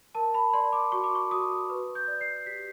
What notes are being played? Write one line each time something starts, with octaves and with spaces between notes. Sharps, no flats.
A#4 A5
B5
D5 C6
D6
F#4 C#6
D6
C#6
F#4 D#6
B4
G6
D5
C7
G4 B6